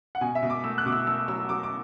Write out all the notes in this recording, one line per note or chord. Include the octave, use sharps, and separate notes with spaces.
F#5
B2 G#5
E5
B2
D6
A3 E6
F#6
B2 D6
E6
A3 E6
F#3 E6
F#3 D6
D6